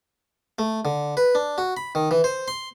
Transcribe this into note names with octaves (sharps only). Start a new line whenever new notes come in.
A3
D3
B4
D4
F#4
B5
D#3
E3
C5
C6